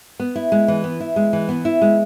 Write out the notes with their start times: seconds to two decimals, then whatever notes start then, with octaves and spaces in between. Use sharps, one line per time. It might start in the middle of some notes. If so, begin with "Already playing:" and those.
0.20 B3
0.36 E4
0.52 G#3
0.68 E3
0.84 B3
1.00 E4
1.16 G#3
1.33 E3
1.49 B3
1.65 E4
1.82 G#3